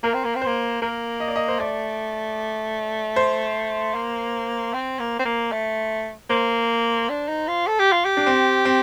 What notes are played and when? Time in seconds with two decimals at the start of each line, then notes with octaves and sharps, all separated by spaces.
0.03 A#3 A#4
0.14 C4
0.25 A#3
0.35 C4
0.42 A#3 C5
0.81 A#3 A#4
1.20 D#5
1.28 D5
1.36 D#5
1.48 C5
1.59 A3 D5
3.16 C5
3.94 A#3
4.73 C4
4.99 A#3
5.19 C4
5.25 A#3
5.52 A3
6.30 A#3 C5
7.09 D4
7.28 D#4
7.48 F4
7.67 A4
7.79 G4
7.92 F4
8.05 G4
8.17 D4
8.26 C4
8.65 C4